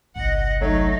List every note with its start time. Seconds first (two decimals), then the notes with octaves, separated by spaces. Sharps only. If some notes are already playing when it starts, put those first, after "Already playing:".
0.16 G1 C2 D#5 F#5
0.61 F#3 A3 D#4